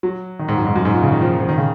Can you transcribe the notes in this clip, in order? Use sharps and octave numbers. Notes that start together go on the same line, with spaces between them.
F#3
D#3
G#2
F#2
G#2
F#2
G#2
A#2
C#3
D#3
F3
F3
D#3
C#3